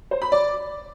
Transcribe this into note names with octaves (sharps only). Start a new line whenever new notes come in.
C5
B5
D5